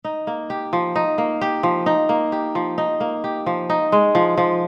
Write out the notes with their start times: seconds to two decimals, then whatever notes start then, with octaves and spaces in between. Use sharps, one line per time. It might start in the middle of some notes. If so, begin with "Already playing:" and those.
0.04 D#4
0.27 A#3
0.50 G4
0.73 F3
0.96 D#4
1.18 A#3
1.41 G4
1.63 F3
1.86 D#4
2.09 A#3
2.32 G4
2.55 F3
2.78 D#4
3.00 A#3
3.24 G4
3.46 F3
3.70 D#4
3.92 G#3
4.15 F3
4.38 F3